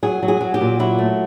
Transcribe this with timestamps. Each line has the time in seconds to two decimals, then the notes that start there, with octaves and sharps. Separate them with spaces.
0.03 F#3 G#4
0.23 F#3
0.28 G#4
0.41 F#3
0.54 G4
0.61 A#2
0.79 F#3 E4
0.99 A3